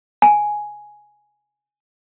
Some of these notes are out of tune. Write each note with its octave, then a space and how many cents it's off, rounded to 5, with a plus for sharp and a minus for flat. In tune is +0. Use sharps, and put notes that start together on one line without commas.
G#5 +5